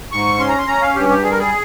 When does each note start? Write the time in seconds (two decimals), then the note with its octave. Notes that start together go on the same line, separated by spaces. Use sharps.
0.12 G#2 C#6
0.40 C#4 C6
0.49 A#5
0.58 C6
0.67 C#4 A#5
0.82 F5
0.95 G2 G4
1.09 G4
1.23 G3 G#4
1.31 A#4
1.39 G#4